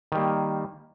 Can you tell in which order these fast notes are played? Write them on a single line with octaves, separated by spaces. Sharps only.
D#3 G3 A#3